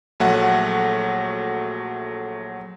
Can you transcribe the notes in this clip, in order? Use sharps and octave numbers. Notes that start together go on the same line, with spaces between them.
A#1 F#3 A3 F#5